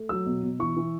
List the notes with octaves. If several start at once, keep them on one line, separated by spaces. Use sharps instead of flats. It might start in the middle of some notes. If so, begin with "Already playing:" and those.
Already playing: A3
F#3 E6
B2
B2
E3 C#6
E3